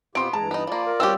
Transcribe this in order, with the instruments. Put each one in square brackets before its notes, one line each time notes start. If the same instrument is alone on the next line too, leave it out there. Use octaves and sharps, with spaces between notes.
[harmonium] B2 F4 G4 [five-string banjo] B3 [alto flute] C4 [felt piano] C6 D7
[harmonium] G2 E3 A#5 [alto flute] G#3 [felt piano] A5
[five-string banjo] B3 D#4 [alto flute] B5
[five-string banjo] F3 A#3 [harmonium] F4 D5
[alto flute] A#4
[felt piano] G3 E6 [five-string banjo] C4 C#4 G4